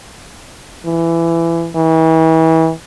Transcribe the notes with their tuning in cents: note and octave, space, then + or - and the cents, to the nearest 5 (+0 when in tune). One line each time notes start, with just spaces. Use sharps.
E3 +20
E3 -35